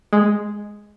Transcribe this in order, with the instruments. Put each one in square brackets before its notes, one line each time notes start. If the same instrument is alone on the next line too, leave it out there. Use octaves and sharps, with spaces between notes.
[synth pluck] G#3